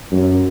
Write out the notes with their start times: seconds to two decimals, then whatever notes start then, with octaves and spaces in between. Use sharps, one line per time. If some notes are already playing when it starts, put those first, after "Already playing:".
0.11 F#2